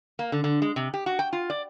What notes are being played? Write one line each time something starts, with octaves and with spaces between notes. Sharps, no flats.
A#3
D3
D3
G#3
C3
G4
F#4
G5
F4
D5